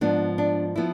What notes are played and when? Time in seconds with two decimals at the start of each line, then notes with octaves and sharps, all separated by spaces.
0.01 G#2 F3 B3 D4
0.38 D4
0.76 F3 B3 E4